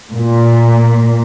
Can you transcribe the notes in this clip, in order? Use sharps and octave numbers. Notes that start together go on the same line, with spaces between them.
A#2